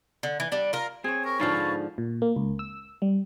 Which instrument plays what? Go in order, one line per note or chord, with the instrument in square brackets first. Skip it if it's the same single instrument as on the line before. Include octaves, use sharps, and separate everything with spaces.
[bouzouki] D3
E3
G3 D4
F4 A#4
[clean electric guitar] C4 [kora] G#4 C#5 [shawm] G#5
[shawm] A#4 [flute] C#6
[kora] G#2 D3 F3 [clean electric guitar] B4 C#5 F5 [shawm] A5
[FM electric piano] A#2
A#3
C#2
E6
G3